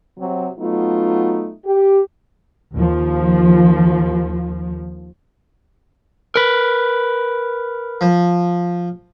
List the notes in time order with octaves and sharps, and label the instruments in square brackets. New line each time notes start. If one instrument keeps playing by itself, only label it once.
[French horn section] C3 F#3
F#3 A3 B3 D#4 F4
G4
[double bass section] D#2 F3
[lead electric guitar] A#4 B4
[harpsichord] F3